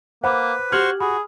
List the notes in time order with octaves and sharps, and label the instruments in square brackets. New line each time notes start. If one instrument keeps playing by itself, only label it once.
[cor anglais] A#3 [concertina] B4 [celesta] C5 B5 D6 [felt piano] F#5
[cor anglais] F#4 [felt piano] G4 F6 [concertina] C5 C#6 [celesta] G#6 F#7
[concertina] F#4 [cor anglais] G#4 [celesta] B5